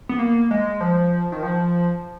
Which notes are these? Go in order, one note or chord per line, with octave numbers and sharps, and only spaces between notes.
B3
A#3
G#3
F3
D#3
F3